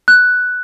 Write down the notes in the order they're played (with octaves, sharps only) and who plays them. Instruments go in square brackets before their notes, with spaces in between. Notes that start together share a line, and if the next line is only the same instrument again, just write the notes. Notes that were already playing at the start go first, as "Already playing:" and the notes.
[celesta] F#6